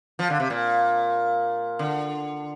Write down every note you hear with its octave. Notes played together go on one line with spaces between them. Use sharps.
F3
D3
C3
A#2
D3